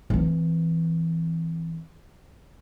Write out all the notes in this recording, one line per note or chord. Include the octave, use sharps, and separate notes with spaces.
E3 C4